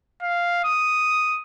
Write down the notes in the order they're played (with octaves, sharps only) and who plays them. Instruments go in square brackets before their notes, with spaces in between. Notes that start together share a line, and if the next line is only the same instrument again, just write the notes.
[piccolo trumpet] F5
D#6